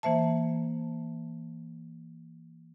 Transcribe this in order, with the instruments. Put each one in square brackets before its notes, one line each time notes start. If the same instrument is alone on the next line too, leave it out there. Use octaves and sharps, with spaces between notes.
[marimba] E3 A#3 C5 E5 A5